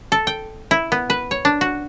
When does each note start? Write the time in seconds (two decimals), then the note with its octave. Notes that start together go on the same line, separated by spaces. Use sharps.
0.12 A4
0.27 G5
0.71 E4
0.92 B3
1.10 B4
1.31 C#5
1.45 D4
1.61 F#4